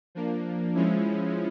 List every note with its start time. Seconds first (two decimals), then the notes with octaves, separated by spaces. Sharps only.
0.15 F3 A#3 D4
0.74 F3 G#3 C#4 E4